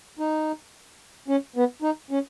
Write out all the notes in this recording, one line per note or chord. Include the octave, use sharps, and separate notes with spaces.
D#4
C#4
B3
D#4
C#4